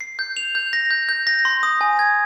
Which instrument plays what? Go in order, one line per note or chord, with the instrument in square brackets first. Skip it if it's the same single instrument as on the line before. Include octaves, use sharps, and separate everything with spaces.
[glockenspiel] C7
G6
F7
G6
A#6
G6
G6
A#6
C6
D#6
G#5
G#6